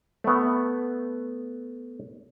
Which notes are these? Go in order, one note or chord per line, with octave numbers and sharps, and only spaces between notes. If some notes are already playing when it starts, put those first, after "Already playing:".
A3 B3